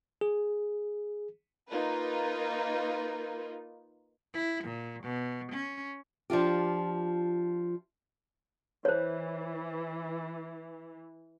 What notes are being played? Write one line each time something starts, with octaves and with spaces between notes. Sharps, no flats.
G#4
A#3 D#4 F4 B4
E4
A#2
B2
C#4
F3 D4 F4 G4
E3 C5 C#5